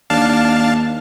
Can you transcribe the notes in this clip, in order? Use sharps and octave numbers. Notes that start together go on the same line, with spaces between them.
D#2 D4 F5 A5